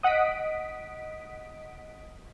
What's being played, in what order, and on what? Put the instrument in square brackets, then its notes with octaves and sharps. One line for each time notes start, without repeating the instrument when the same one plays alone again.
[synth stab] D#5 F#5 D#6 B6 D7